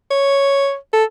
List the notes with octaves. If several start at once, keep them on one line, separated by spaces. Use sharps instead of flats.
C#5
A4